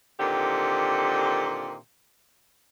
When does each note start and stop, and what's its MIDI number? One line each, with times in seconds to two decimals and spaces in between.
0.19 1.75 46
0.19 1.75 50
0.19 1.75 51
0.19 1.75 60
0.19 1.75 67